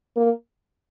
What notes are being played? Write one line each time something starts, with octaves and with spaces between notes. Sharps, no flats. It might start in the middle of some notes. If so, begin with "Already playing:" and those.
A#3